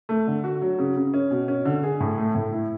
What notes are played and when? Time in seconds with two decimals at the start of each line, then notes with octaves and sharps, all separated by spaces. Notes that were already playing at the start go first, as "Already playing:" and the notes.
0.09 A3
0.27 D3
0.44 F#4
0.62 F#3
0.79 C#3
0.96 C#3
1.14 C#4
1.31 B2
1.48 C#4
1.65 D3
1.83 G#4
2.00 A2
2.17 A3
2.35 A2
2.53 E4